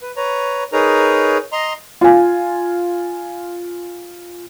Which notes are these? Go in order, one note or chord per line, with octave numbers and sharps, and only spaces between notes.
B4
B4 C#5 A#5
D#4 G#4 A#4 B4 C#5 A#5
D#5 A#5 C6
F4 G#5